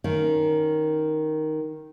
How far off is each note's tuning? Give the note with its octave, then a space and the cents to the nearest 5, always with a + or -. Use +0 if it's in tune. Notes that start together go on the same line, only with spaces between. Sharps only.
D#3 +0 C#4 +0